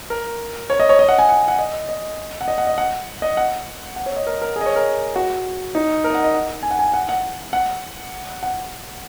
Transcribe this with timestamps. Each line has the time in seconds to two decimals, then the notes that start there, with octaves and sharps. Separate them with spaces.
0.10 A#4
0.70 C#5
0.80 D#5
0.89 C#5
0.99 D#5
1.09 F#5
1.19 G#5
1.29 F#5
1.48 F#5
1.59 D#5
1.89 D#5
2.41 F#5
2.48 D#5
2.58 F#5
2.67 D#5
2.78 F#5
3.22 D#5
3.37 F#5
3.96 F#5
4.06 C#5
4.16 D#5
4.27 A#4
4.42 A#4
4.56 G#4
4.61 D#5
4.66 C#5
4.76 A#4
5.16 F#4
5.75 D#4
6.04 A#4
6.10 D#5
6.14 F#5
6.24 D#5
6.34 F#5
6.63 G#5
6.71 F#5
6.79 G#5
6.94 F#5
7.09 F#5
7.53 F#5
8.43 F#5